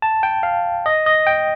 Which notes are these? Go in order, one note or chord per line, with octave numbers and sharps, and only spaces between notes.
A5
G5
F5
D#5
D#5
G5